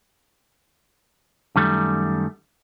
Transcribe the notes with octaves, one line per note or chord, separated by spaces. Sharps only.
F#2 D#3 G3 A3